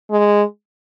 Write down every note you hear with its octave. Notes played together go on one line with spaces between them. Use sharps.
G#3